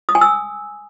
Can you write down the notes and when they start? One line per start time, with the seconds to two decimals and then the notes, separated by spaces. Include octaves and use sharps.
0.09 D#6
0.15 G#5
0.21 E6